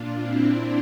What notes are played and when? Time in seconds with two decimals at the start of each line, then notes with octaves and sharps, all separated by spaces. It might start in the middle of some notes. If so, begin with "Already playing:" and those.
Already playing: A#2 D4 F4
0.18 C4 E4